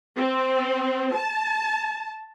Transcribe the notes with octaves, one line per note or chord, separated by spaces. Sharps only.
C4
A5